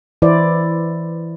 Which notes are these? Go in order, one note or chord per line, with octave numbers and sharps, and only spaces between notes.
E3 E4 C5 D5